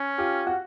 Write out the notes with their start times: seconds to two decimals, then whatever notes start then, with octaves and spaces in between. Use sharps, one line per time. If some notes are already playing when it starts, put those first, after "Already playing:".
Already playing: C#4
0.18 F4 G4
0.47 F#4